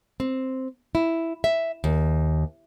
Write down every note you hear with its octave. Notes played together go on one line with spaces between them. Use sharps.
C4
E4
E5
D#2